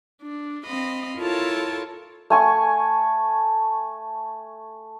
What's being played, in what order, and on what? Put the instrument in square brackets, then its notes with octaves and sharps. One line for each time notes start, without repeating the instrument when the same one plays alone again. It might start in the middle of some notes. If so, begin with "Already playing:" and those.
[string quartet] D4
C4 D#5 F5 B5
E4 F4 A4 A#4 C#5 A5
[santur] A3 G#5 C#6